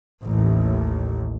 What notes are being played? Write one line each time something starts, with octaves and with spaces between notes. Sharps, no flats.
A1 D#2